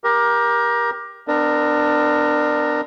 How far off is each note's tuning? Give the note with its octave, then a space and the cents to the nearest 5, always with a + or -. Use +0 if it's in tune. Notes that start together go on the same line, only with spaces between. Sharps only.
G4 +10 A#4 +20
B3 +45 D4 +25 A#4 +0